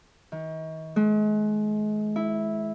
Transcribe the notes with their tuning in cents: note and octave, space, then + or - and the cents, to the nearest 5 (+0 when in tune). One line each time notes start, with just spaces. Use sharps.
D#3 +40
G#3 +35
E4 -10